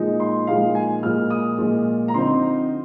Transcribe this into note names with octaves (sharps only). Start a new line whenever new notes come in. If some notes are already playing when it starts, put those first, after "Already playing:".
Already playing: A#2 F3 G#3 D#4
C6
A#2 F3 G#3 D#4 F5
G#5
A#2 F3 G#3 F6
D#6
A#2 F3 G#3
A#5
D3 F3 C4 D#4 C6